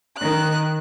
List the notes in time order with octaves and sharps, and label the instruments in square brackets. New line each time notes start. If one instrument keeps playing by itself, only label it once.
[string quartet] D#3 F#6